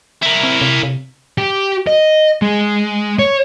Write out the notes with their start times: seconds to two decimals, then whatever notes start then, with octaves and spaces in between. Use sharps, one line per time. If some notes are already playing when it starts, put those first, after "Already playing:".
0.23 E4 A#4
0.43 C4
0.61 C3
0.83 C3
1.38 G4
1.87 D#5
2.42 G#3
3.19 C#5